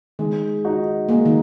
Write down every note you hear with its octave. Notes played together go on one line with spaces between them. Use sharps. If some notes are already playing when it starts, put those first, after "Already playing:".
D#3 G#3
D#4 F#4
G#3 A#3
D#3